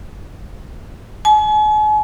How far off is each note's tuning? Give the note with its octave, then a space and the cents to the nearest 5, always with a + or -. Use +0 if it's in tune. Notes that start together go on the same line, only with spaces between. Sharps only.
G#5 +45